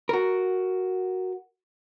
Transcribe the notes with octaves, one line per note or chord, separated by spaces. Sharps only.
F#4 A#4